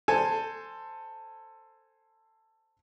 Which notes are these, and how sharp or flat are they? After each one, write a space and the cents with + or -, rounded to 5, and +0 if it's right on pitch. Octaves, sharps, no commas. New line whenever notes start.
A4 +15 C5 +0 G#5 +0